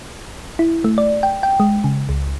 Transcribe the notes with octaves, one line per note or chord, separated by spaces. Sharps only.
E4
A3
D5
G5
G5
G#3
C#3
C#2